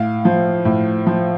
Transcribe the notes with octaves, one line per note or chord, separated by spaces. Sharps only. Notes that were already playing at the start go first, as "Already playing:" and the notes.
Already playing: A2 F5
F3
A2
F3